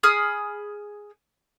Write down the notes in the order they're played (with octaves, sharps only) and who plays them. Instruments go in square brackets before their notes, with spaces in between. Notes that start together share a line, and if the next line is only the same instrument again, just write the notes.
[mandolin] G#4 B5 D#6 F6